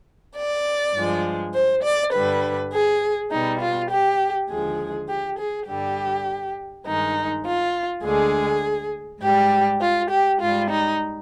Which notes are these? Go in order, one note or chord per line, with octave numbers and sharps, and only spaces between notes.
D5
G2 F3 G#3
C5
D5
G2 D3 G3 B4
G#4
B2 G3 D#4
F4
G4
D#2 D3 F3 G#3 G#4
G4
G#4
G2 D3 G3 G4
G2 D#3 G#3 D#4
F4
D2 D3 G#3 G#4
G#2 G3 G4
F4
G4
G#2 G3 F4
D#4